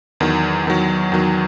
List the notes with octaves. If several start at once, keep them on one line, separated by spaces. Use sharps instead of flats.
E2 D#3 F#3
E2 D#3 F#3
E2 D#3 F#3